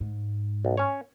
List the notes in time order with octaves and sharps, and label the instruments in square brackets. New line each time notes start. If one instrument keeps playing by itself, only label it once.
[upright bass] G#2
[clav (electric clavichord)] B1
C#4 C#5